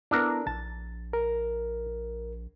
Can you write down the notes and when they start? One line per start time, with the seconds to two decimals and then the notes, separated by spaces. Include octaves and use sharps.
0.11 B3 D4 E4 A4 A#4
0.47 A#1 A5 A6
1.13 A#4